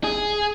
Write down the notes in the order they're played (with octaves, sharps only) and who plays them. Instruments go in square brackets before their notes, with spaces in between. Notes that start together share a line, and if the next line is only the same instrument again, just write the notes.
[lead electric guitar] G#4